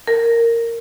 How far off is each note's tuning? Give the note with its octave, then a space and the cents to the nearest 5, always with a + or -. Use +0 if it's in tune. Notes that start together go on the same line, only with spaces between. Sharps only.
A#4 -10